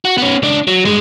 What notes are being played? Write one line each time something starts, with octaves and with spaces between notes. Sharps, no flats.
F#4
B3 C#4
C#2 D4
F#3
G2 G#3